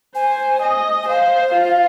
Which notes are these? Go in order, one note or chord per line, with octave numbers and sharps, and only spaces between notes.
C5 G#5
D#5
G#5
C5 F5
F4